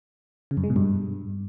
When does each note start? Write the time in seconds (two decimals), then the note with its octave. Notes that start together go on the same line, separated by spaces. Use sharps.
0.51 C#3
0.57 F#2
0.64 G#3
0.70 B2
0.76 G2